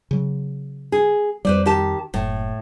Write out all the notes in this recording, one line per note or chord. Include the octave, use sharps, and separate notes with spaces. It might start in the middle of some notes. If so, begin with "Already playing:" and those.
C#3 F#3
G#4
F2 G3 B4 C5 D5
D#3 G4 A5
F#1 A2